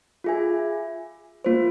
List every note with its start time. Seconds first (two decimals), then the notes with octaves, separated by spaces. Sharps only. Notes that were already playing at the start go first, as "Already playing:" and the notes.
0.24 F4 G#4 E5 G#5
1.45 A#3 F4 C5